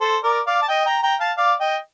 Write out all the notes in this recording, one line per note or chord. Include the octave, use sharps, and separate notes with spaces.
A4 C5
A#4 D5
D5 F5
A5
D#5 G5
G5 A#5
G5 A#5
F5 A5
D5 F5
D#5 G5